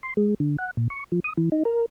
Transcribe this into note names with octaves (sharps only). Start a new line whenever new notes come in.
C6
G#3
D3
F#5
A#2
C#6
F3
D#6
E3
D#4
A#4